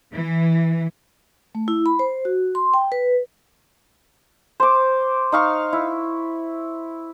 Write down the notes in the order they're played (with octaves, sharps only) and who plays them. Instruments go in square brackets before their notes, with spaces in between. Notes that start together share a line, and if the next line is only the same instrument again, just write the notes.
[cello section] E3
[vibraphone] A3
E4
B5
C5
F#4
C6
G5
B4
[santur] C5 D6
D#4 F5 C#6
E4